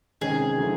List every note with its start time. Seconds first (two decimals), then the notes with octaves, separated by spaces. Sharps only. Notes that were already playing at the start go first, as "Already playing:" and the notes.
0.21 C3 D#3 G#3 C#4 G#4
0.58 D3 F#3 A3 C4 E4